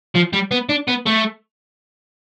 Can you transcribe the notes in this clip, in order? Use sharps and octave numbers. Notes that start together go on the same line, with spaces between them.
F3
G3
B3
D4
B3
A3